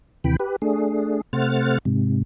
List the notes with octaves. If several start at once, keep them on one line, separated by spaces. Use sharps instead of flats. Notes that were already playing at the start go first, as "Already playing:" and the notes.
D#2 C3 E3 G5 B5
G4 B4
A3 D4 G#4
C3 A3 C5 F#5 F6 A6
G#2 C3